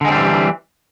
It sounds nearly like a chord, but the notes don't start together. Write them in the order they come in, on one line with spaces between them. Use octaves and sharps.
D3 G#3 C4 G3 E3